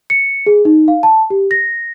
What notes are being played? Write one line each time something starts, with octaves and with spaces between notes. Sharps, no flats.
C#7
G#4
D#4
F5
A5
G4
A#6